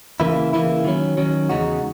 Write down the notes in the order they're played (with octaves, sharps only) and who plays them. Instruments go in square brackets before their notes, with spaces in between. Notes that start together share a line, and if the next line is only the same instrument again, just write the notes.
[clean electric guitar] C#3 E3 A#3 E4
C#3 E3 A#3 E4
D#3 F#3 C#4
D#3 F#3 C#4
E2 C#3 G#3 D#4 F#4